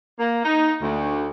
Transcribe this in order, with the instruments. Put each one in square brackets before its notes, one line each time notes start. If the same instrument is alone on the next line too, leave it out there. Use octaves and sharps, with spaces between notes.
[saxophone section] A#3
D#4
D2